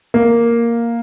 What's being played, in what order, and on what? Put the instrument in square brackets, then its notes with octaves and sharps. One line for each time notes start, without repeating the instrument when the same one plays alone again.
[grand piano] A#3